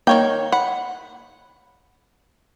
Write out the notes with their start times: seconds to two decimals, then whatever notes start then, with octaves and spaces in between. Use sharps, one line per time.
0.07 D#3 A#3 C#5 G5
0.52 F#5 B5